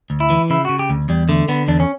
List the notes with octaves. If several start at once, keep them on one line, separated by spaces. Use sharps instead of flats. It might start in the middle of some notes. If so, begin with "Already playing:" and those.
D2
E4
E3
C#3 E4
C#3 F#4
G4
D2
E2 G3
D3 A3
D3 B3
E2 D4
C#4